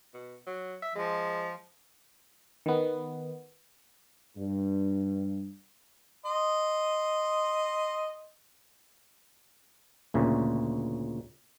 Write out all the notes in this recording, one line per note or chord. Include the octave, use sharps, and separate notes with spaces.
B2
F#3
E5
F3 G#3
D#3 B3
G2
D#5 C6
D2 A#2 C#3